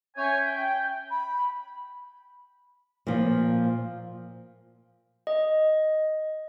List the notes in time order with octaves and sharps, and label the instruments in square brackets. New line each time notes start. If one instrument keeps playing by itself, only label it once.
[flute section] C#4 E5 G6 [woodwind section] C#5 G#5
[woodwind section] G5
[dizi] B5
[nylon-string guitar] A#2 F3
[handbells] D#5